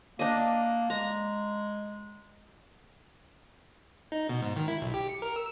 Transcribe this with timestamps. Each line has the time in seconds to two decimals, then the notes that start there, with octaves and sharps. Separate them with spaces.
0.19 A#3 D4 D#5
0.90 G#3 A#5
4.12 D#4
4.29 B2
4.42 G#2
4.56 D#3
4.68 E4
4.81 B1
4.94 G4
5.09 C#7
5.22 A#4
5.36 E6